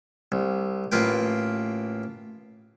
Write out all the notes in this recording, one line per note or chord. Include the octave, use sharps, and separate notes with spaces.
C2
A1 A#3 F4 B4 G5